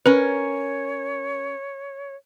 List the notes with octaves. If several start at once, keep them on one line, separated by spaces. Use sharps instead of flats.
C#4 A#4 B4 C#5